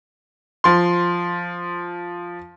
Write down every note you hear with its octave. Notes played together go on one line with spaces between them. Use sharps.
F3 C6